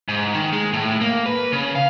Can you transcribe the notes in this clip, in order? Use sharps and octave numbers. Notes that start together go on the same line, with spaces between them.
G#2
D#3
G#3
A2
A#3
B4
C#3
F5